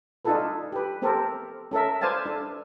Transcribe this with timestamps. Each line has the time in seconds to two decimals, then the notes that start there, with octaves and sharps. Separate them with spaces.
0.25 D4 D#4 F4 G#4 A4 B4
0.72 G4 B4
1.02 B3 C4 G4 A4 A#4 C5
1.71 C#4 A4 A#4 E5
2.01 B4 C5 D5 F5 G#5 A5
2.26 D4 A4